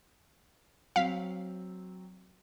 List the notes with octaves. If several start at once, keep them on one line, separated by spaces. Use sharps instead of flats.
F#3 C4 F5 B6